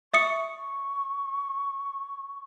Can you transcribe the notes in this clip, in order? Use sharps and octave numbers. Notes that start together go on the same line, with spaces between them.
E5 C#6 D#6 C#7